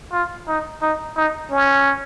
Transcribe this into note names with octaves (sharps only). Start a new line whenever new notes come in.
F4
D#4
D#4
D#4
C#4